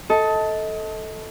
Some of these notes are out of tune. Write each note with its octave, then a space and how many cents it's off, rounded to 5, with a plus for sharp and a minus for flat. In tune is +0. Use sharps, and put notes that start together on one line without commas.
A4 +0 D#5 +30